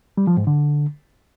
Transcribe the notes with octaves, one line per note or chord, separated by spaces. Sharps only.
G3
F3
G#2
D3